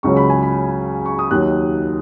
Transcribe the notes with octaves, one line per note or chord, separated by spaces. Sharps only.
C#2 C#3 F#3 C#6
B5
G#5
B5
C#6
D#6
D#2 D#3 F#3 F#6